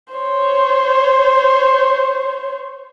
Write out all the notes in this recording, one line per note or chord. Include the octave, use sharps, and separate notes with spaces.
C5 C#5